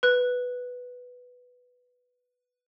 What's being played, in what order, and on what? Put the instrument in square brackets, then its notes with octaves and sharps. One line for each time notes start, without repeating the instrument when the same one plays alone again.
[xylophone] B4 F#6